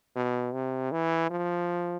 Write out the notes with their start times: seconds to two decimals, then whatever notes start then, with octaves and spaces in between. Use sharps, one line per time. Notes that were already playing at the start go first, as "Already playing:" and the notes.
0.16 B2
0.54 C3
0.92 E3
1.31 F3